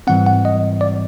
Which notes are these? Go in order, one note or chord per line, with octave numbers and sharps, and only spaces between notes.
G#2 E3 G3 C4 F#5
F#5
D#5
D5